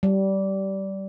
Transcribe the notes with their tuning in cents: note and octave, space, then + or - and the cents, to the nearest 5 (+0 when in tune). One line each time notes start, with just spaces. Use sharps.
G3 -20